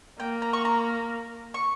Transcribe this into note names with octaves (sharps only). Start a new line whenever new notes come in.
A#3 G5
A#5
C#6
A#5
C#6